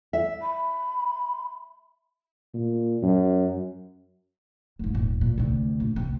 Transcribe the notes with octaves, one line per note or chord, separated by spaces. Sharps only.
E5
B5
A#2
F#2
F1 G#2
D#1
A#2
D2 C3
A#1
C3 C4